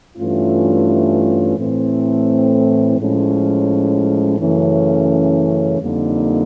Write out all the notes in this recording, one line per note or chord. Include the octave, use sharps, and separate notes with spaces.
G2 E3 A3 C#4 F4
A2 E3 A3 C4
A2 F3 G#3 C#4
F#2 C#3 E3 A3 C#4
F2 D3 G3 A#3 D#4